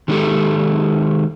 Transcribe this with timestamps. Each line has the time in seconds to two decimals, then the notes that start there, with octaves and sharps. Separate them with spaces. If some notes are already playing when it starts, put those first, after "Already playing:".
0.08 D#3 G#3 C#4 E4 G4 A4